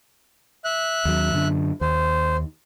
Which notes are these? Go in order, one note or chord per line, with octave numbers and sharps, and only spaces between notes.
E5 F#6
D#2 F#3
F#2 D3
D#2 C5